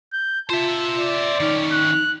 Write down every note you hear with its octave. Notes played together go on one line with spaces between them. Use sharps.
G6
F4 C5 E5 A5
D5
D#3 C#4 D#4
F#6